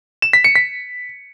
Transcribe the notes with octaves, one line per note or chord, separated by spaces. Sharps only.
E7
B6
C#7
B6